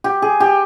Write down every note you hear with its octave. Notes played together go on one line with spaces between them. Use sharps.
G4
G#4
G4